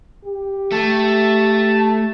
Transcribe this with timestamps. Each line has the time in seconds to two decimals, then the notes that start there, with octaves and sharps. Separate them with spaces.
0.25 G4
0.72 A3 A5